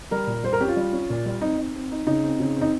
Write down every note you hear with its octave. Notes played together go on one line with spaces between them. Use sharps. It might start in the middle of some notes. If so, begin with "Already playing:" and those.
G3 A#4
A#2
G3 C5
A#4
C#4 G4
F4
G3
C#4
A#2
G3
C4 D#4
D#4
C4
D#4
C#3 D#4
C4
C#3
C4
D#4